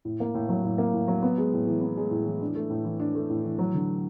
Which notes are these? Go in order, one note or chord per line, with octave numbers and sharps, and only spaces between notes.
A2
A#3
A2
F#3
A2
A#3
A2
F#3
B3
G#3
A2
E3
B3
G#3
A2
E3
D4
A3
A2
E3
D4
A3
A2
E3
F#3
D3